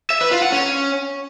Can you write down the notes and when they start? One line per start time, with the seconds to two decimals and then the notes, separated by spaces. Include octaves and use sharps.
0.10 E5
0.21 B4
0.31 F4
0.42 F#5
0.52 C#4